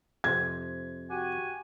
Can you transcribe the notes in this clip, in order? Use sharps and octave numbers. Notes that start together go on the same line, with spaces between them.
F2 C3 C5 G#6
F#4 G4 G#5